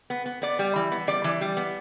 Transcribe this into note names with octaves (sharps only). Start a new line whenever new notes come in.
B3
B3
B3 D5
G3
E3
B3
G3 D5
E3
G3
B3